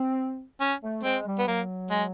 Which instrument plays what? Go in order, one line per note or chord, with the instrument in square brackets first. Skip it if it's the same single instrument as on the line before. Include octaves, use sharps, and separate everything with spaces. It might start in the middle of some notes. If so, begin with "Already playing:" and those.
Already playing: [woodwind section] C4
[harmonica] C#4
[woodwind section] A3
[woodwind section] G#3 [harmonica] C4
[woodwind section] G3
[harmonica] B3
[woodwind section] F#3 [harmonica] A#3
[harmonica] G#3